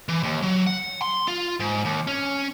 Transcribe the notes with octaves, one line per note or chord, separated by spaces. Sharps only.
E3
D#2
F#3
F#5
C6
F4
G#2
D#2
C#4